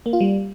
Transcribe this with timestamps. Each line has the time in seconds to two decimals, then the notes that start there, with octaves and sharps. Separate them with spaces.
0.06 A#3
0.13 F4
0.21 G3